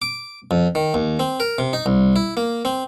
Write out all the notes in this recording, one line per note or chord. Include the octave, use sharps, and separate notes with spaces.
D6
F2
D#3
D#2
C4
A#4
C3
D#4
C2
E4
A#3
C4